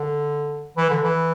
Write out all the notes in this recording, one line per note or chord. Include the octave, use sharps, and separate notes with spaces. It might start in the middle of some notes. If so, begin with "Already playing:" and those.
Already playing: D3
E3
D3
E3